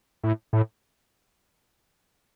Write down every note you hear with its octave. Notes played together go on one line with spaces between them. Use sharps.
A2
A2